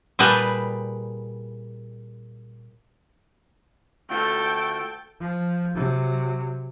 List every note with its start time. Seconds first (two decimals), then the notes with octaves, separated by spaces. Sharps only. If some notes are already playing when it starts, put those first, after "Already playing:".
0.19 A#2 G3 G#4 B4 G5 A5
4.10 D2 A3 F4 F#4 A4 G5
5.20 F3
5.75 C3 F#3